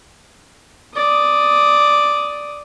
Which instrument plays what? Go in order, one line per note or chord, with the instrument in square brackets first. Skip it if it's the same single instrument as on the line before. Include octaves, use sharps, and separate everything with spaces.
[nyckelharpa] D5 D#6